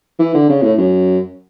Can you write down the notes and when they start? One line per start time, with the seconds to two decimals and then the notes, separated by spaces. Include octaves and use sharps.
0.20 E3
0.35 D3
0.49 C#3
0.63 A2
0.78 F#2